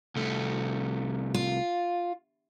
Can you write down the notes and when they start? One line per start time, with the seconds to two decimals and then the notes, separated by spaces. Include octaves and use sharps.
0.16 C2 A3
1.34 F4